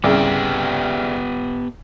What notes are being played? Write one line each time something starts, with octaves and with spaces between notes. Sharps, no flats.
C2 C#3 B3 G4